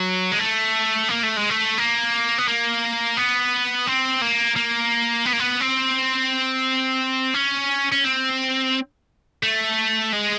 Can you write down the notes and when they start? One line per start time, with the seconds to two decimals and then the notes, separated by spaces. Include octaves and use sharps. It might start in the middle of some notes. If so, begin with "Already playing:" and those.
Already playing: F#3
0.32 G#3
0.39 A3
1.09 A#3
1.23 A3
1.36 G#3
1.50 A3
1.78 A#3
2.38 B3
2.48 A#3
3.17 B3
3.87 C4
4.22 A#3
4.56 A#3
5.26 B3
5.33 A#3
5.40 B3
5.61 C4
7.35 C#4
7.92 C#4
8.04 C4
9.43 A3
10.13 G#3